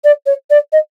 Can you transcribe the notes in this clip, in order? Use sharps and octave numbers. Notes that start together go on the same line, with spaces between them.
D5
C#5
D5
D#5